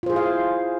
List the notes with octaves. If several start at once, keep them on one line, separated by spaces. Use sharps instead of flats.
E4 F4 G#4 C5 F5